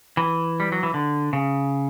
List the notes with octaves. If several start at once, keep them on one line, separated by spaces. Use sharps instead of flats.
E3
G3
F#3
E3
D3
C#3